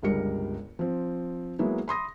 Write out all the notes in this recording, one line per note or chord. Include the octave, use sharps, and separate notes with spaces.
G1 C#2 G2 G3 A#4 C#7
F3 C4
F#3 G#3 A#3 B3 E4
B5 C6 D#6 A#6